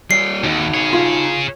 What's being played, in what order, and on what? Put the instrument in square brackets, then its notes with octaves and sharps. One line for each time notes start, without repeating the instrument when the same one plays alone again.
[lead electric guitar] G3 C#5 [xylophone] C7
[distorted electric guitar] D#2 [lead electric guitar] D#4 F#4
[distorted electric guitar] G#4 C#5
[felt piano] F4